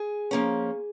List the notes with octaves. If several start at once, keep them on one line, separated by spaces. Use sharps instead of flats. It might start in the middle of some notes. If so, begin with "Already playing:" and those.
Already playing: G#4
F3 A#3 C#4